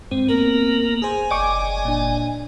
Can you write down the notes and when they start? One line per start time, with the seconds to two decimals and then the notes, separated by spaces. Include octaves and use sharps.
0.11 G2 G#3 C4
0.28 A#3 B3 A#4
1.02 G#4 C5 G#5
1.31 F#1 D5 D#5 G5 C#6 D6
1.85 A#2 D4